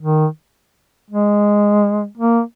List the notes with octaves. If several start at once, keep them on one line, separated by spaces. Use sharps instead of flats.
D#3
G#3
A#3